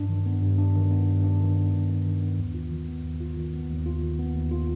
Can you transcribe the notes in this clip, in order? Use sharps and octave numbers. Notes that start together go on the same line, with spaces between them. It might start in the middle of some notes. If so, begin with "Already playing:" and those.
Already playing: G2 D4
D#3
B3
G2
D4
D#3
B3
G2
D4
D#3
B3
G2
D4
D#3
B3
D#2
F4
D#3
B3
D#2
F4
D#3
B3
D#2
F4
D#3
B3
D#2
F4